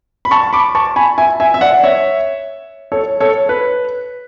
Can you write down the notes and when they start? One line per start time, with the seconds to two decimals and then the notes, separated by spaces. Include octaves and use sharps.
0.25 B5
0.31 A5 C#6
0.53 B5 D6
0.75 A5 C#6
0.96 G#5 B5
1.18 E5 G#5
1.40 E5 G#5
1.54 E5
1.61 D5 F#5
1.83 C#5 E5
2.92 A4 C#5
3.20 A4 C#5
3.49 B4